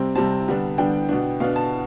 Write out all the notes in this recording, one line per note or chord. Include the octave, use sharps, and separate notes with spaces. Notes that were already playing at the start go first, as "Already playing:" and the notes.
Already playing: C3 G3 C4 G5
C3 G3 C4 A5
D3 G3 B3 D4
D3 G3 B3 D4 G5
B2 B3 D4
B2 B3 D4 F5
A5